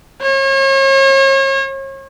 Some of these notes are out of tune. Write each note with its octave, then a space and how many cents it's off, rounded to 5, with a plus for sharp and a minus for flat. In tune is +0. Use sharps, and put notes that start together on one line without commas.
C#5 -40